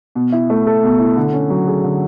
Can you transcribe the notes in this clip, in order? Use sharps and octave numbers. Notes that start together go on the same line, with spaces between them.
B2
E4
A3
A4
B2
E4
D3
C#4
F#3
G#4
D3